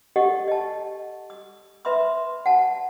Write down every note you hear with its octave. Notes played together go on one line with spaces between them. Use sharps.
G4 A4 D#5 F#5 C#6
D#5 A5
D#6
B4 E5 B5 C6 D#6
F#5 A5